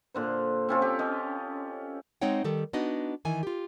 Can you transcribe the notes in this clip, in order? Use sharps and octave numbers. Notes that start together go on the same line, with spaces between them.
A#2 D3 C5
C4 C#4 F4 A4
G4
C#4 D#5
G#3 C4 D#4 C#5 F#5 G5
D#3 G3 A4
B3 D4 D#4 F#4 D#5
D#3 E3 G#5
F4 G4